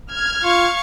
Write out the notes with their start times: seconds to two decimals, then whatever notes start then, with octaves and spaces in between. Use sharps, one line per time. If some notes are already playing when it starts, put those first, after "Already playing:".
0.11 F6 G#6
0.43 F4 F5 C#6